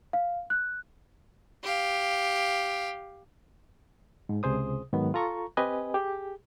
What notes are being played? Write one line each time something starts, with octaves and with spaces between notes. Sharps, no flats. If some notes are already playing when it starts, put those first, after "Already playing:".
F5
F#6
G4 F5
G#2
C#2 C3 G#4 C5 D#6
G#2 D#3 F#3 B3
F4 A4 A#5 C#6
C4 G4 B4 D#5 G#5
G4 G#4